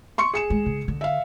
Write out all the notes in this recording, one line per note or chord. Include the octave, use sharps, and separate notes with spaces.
C6 C#6 C#7
G#4 C#7 E7
G#3
C#3
D3
E5 F5